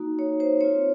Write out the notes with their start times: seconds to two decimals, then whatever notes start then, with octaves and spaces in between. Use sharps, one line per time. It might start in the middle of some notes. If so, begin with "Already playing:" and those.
Already playing: A#3 D#4 F#4
0.19 C#5
0.40 C5
0.61 C4 F4 C#5